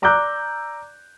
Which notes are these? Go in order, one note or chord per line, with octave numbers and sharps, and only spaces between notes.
D5 A#5 D6 E6 F#6 G6